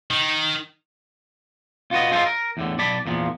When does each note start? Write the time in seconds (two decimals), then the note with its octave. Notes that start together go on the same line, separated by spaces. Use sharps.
0.11 D#3
1.91 F4 F#4 B4 D#5
2.12 F4 G#4 A4 C5 D#5 F5
2.26 A#4
2.57 E2 A2 D3
2.78 B1 D5 A5 B5
3.06 E2 A#2 F3